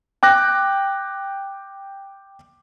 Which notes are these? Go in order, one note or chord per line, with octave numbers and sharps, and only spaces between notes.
G5 D6 F#6 A#6